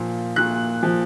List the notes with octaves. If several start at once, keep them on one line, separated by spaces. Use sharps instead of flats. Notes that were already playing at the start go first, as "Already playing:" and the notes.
Already playing: A#2 F3
A#2 F#6
F3